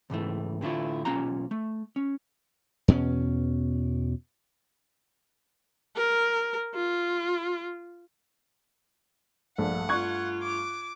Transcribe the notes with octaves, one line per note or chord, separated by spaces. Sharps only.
C#2 G#2 E3 A3
A2 D3 A3 E4 F4
B1 A#3 C#4 F4 A#5
A3
C#4
E2 B2 B3 C#4
A#4
F4
A#1 G2 A3 F#5
F4 C#6 F#6 G#6
D6